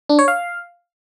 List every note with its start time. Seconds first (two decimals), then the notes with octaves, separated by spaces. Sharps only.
0.09 D4
0.19 C#5
0.28 F5